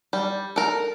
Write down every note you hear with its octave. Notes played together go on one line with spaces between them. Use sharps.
G3
A4 A#4